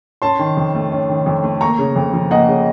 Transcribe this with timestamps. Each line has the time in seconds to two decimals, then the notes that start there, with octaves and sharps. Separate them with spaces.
0.22 C#4 A5 C6
0.39 D#3
0.57 F2
0.75 A3
0.92 C#4
1.09 D#3
1.26 F2
1.43 A3
1.61 A#3 A#5 C#6
1.79 C#3
1.96 F2
2.13 F3
2.31 A#3 D#5 F#5
2.48 C#3